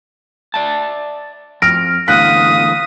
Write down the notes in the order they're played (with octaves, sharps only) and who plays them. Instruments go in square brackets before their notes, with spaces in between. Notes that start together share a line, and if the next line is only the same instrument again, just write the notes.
[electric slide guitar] D5 E5 A5
[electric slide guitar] F2 [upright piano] F6 D7 [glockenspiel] A#6
[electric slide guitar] E2 A2 D3 [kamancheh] F5 D#6 [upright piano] F#6 [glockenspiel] B6